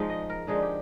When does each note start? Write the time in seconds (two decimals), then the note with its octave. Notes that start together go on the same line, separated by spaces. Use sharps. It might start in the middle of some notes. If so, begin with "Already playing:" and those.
Already playing: F3 G#3 D#4
0.10 D#5
0.30 A#4
0.47 D3 F3 G#3 D#4 G#4
0.63 G4